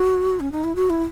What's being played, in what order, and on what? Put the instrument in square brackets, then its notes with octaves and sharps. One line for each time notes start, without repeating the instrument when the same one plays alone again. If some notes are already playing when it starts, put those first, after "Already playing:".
Already playing: [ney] F#4
C#4
D#4
E4
F#4
E4